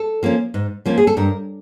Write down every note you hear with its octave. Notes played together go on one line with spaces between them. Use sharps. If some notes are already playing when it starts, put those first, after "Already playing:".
Already playing: A4
F3 A#3 C#4
G#2
F3 A#3 C#4
G#4
A4
G2 A#4